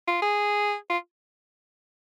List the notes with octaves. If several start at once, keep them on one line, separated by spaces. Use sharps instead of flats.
F4
G#4
F4